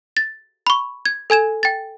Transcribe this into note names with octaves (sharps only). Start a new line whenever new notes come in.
A6
B5 C#6
G#6
A4 G#5 G#6 E7
G5 A6